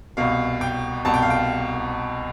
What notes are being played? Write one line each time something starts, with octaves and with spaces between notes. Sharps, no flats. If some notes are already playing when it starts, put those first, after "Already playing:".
C2 B2 F5
G5
C2 B2 A5
G5
F5
G5